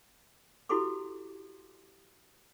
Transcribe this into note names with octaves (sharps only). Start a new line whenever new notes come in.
E4 F#4 G4 A4 C6 D6